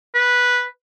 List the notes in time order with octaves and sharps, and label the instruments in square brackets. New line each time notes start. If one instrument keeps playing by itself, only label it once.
[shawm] B4